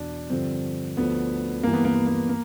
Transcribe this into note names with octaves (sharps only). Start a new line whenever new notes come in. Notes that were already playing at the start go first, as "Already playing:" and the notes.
Already playing: E2 B2 D4
G2 D3 F3 C4
D2 D3 F3 B3
G2 E3 A#3
B3
A#3
B3
A#3
A#3